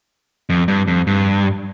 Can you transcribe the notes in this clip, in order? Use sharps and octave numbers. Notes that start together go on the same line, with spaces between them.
F2
G2
F2
G2